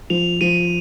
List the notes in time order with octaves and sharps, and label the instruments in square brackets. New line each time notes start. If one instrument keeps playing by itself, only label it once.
[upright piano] F3 [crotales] F7
[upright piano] F3 [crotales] D#7